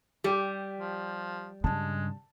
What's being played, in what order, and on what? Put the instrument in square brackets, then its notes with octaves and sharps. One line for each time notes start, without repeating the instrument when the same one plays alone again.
[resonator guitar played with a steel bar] G3 [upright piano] G4
[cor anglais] F3
[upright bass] G2 C#3 [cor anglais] G#3 [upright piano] A5